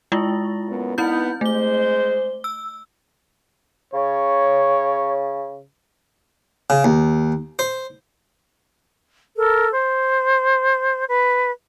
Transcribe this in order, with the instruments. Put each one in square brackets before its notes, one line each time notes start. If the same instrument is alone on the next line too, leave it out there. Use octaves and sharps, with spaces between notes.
[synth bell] G#3 E4 F4
[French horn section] F#2 A#2 B3
[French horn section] B3 D#4 [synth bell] C4 E4 G6
[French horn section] G#3 C5 [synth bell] A3 G7
[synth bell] E6
[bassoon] C#3 [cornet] C#5
[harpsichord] C#3
D#2
C5
[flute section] A4 A#4
C5
B4